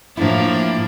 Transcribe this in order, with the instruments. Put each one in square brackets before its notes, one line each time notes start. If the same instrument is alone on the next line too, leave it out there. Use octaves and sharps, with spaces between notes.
[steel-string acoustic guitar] A2 E4 [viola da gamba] F3 A#3 D4